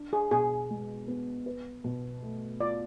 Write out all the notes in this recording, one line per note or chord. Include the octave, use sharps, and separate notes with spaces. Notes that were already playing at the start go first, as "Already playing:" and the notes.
Already playing: D4
G#4
B2 G#4
G#3
B3
B4
B2
A3
F4 D5